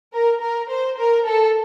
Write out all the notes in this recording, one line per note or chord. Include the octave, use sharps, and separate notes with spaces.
A#4
A#4
C5
A#4
A4